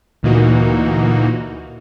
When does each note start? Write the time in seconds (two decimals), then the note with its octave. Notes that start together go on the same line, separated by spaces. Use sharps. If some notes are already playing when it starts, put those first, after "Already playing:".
0.23 D2 A#2 E3 A#3 D#4 F#4